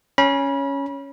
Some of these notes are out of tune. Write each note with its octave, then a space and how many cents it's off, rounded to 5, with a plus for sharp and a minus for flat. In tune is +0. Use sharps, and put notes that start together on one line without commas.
C#4 +5 B5 -35